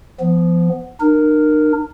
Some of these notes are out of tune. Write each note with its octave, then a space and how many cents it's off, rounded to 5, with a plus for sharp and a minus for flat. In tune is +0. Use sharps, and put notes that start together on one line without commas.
F3 -25 B3 +5
D#4 -45 A#4 +0